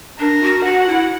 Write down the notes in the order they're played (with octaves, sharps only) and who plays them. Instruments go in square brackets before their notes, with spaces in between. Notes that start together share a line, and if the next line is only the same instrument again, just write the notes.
[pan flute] D4 [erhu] A#4
[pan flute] F#4
[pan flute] F#4 [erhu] F#5
[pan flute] E4